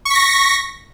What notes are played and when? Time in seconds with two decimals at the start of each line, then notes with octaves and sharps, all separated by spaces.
0.05 C#6
0.10 B6
0.15 A#6